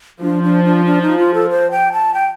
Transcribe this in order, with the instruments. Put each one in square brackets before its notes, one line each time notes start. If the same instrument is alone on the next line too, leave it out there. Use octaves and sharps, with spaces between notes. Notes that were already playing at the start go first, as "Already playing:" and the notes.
[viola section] F3 [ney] D4
[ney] D4
D4
D4
D#4
F4
A4
C5
G5
A5
G5